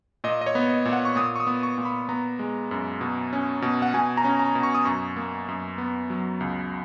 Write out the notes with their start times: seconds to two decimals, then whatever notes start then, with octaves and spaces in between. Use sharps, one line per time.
0.24 A#2 D#5
0.41 D#5
0.46 C#5
0.55 B3
0.69 D#5
0.85 A#2
0.93 F#5
1.05 C#6
1.16 A#2 D#6
1.36 C#6
1.40 D#6
1.47 B3
1.63 C#6
1.78 A#2
1.85 B5
2.09 B3 A#5
2.39 G#3
2.71 F#2
3.01 B2
3.33 C#4
3.62 B2
3.82 F#5
3.94 B2 G#5
4.17 A#5
4.25 C#4
4.39 A#5
4.55 B2
4.63 C#6
4.75 D#6
4.85 F#2 C#6
5.16 A#3
5.48 F#2
5.78 B3
6.10 F#3
6.41 C#2